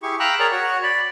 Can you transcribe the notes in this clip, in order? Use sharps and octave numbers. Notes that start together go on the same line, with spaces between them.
E4 G4 G#4 C#6
F5 G5 A#5 B5 E6 F#6
G#4 A#4 C#5 D5 A#5
F#4 C#5 F#5
D5 B5